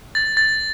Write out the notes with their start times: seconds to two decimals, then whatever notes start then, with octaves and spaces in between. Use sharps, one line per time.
0.15 A6
0.37 A6